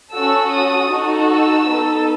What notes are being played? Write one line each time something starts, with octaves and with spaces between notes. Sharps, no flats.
C#4 F#4 A4 E6
D#6
D#4 F#4 A4
E6
B3 D#4 A4